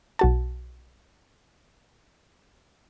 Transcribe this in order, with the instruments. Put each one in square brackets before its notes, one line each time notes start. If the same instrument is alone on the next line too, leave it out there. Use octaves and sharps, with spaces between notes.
[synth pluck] B1 F#4 A5